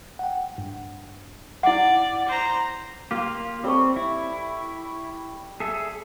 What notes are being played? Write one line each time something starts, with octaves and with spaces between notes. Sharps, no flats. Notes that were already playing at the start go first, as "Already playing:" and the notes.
F#5 G5
G2
E4 D5 F#5
C5 A#5
A#3 F4 G4
G3 C4 A4 C#6
E4
G#4 A4 E5